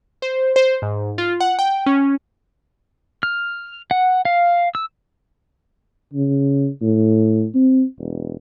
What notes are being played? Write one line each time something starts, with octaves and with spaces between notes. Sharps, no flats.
C5
C5
G#2
F4
F#5
G5
C#4
F6
F#5
F5
E6
C#3
A2
C4
E1